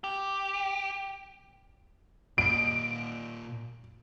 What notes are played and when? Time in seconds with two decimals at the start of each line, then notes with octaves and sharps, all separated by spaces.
0.04 G4
2.38 A#2 D#5 D7